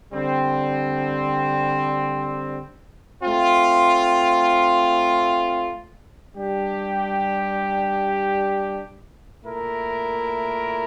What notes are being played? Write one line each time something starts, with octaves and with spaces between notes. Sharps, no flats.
D3 G3 C4
A3 C4 F4
G3 D4 G4
A#2 A3 E4 A#4